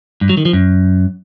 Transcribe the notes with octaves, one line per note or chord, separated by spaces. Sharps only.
G2
F#3
D#3
F3
F#2